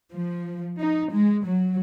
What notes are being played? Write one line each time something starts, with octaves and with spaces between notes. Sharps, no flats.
F3
D#4
G#3
F#3